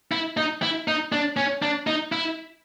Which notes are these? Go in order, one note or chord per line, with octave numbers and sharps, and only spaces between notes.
E4
D#4
E4
D#4
D4
C#4
D4
D#4
E4